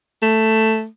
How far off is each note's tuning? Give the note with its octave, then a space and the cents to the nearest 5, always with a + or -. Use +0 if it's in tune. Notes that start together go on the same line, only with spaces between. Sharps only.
A3 +5